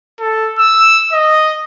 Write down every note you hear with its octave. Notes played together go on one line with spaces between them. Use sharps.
A4
E6
D#5